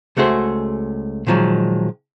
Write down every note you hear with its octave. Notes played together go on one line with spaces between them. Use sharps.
C#2 A3 F#4 G#4 C5
A#2 D#3 F3 F#3 G#3